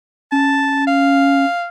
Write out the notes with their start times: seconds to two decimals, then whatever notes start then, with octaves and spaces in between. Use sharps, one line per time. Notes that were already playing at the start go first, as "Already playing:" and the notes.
0.32 C#4 A5
0.87 F5